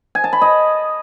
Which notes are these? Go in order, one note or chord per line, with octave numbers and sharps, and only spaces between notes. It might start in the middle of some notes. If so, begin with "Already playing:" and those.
G#5
A5
B5
D#5